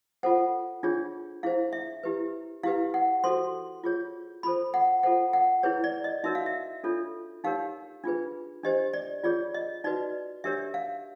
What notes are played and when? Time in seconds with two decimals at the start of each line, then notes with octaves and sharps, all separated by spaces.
0.23 F4 A4 C5 F#5
0.83 D4 F4 G#4 C#5
1.43 E4 G#4 C5 F5
1.73 E5
2.03 E4 G4 B4
2.63 E4 G4 B4 F5
2.94 F#5
3.24 F#4 A4 C5 C6
3.84 F4 G#4 C#5
4.43 F4 A4 C5 B5
4.74 F#5
5.03 F4 A4 C5 F#5
5.33 F#5
5.63 E4 G#4 B4 C#5
5.84 D5
6.04 D#5
6.24 D#4 F#4 A#4 C#5 E5
6.35 F5
6.46 E5
6.84 D4 F4 A4 C#5
7.44 D#4 G4 A#4 C#5 F5
8.04 D4 F4 G#4 B4
8.63 D4 G4 C5 D#5
8.94 D5
9.24 F4 G#4 C#5 D5
9.54 D#5
9.84 D#4 F#4 B4 D5
10.44 D4 G4 A#4 C#5 E5
10.74 F5